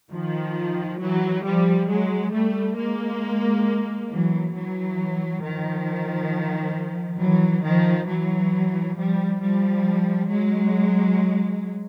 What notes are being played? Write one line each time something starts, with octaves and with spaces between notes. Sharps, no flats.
D#3 F3
E3 F#3
F3 G3
F#3 G#3
G3 A3
G#3 A#3
E3 F#3
E3 F#3
D#3 F3
E3 F#3
D#3 F3
E3 F#3
F3 G3
F3 G3
F#3 G#3